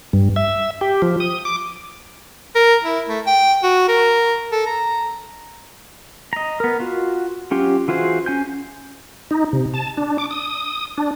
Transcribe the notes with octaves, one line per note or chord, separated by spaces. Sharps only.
G2
E5
G4
F3
D#6
D6
A#4
E4
A3
G5
F#4
A#4
A4
A#5
D#5 A#5
B3 A#4
F4 F#4
F#3 C#4 F4 G4
E3 F4 F#4 G#4 C5
C#4 G#5 G6
D#4
C3
A5
D4
D6
D#6
D4